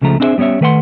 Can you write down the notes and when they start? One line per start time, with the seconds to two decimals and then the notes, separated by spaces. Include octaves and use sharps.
0.01 C#2 C#3 F3 A3 A#5
0.20 C4 D4 E4 G#4 C5 E5
0.38 G3 B3 C#4 C#5 E5
0.61 D#3 A3 B4 F5 F#5 C6